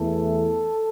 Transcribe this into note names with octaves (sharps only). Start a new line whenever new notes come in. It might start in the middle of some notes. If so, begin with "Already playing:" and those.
Already playing: E2 E3 A3 A4